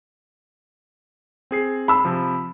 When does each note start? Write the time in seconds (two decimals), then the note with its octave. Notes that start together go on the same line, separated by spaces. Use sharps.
1.51 C4 G#4 C7
1.88 B5 E6
2.05 C3 F3